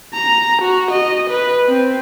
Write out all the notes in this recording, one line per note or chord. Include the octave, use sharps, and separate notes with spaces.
A#5
F#4
D#5
B4
C4